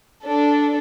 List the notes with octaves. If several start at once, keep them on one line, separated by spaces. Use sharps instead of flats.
D4 A4